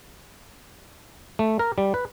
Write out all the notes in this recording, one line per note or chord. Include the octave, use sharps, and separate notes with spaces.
A3
A#4
G3
B4